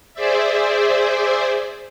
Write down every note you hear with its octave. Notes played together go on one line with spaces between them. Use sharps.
G#4 C5 D5 E5